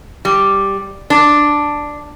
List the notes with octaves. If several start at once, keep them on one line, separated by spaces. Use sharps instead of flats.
G3
D4